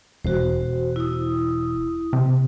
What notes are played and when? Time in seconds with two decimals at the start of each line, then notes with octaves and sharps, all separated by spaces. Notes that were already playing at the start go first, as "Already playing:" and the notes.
0.25 E1 F#4 C5
0.96 E4 D#6
2.13 C3